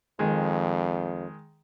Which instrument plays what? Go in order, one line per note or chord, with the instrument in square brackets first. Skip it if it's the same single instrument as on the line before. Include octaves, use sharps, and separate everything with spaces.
[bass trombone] F2 [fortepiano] D#3 G#3